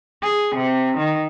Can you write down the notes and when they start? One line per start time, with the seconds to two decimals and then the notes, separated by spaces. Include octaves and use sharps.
0.22 G#4
0.55 C3
0.97 D#3